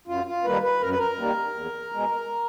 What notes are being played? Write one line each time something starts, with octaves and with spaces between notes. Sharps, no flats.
F#2 F4
F4
D#3 G3 A#3 B4
B4
F#2 A#4
B4
A#4
D#3 G3 A#3
E2
B2 G#3